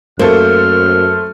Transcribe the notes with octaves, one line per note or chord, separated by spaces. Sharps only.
F#2 A3 A#3 A4 C5 F6